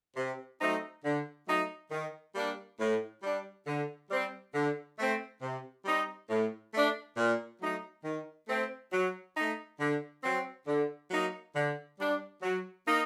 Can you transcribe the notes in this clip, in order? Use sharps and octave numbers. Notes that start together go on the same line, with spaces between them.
C3
F#3 A3 C4 D#4
D3
F#3 A3 D#4
D#3
G3 A#3 D4
A2
G3 D4
D3
G3 C4
D3
A3 C4
C3
G3 C4 D#4
A2
A3 D4
A#2
F#3 A3 D#4
D#3
A3 C4
F#3
A3 D#4
D3
F#3 C4
D3
F#3 A#3 D#4
D3
G3 D4
F#3
A#3 D#4